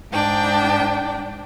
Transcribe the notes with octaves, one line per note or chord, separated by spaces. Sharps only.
G#2 D4 G5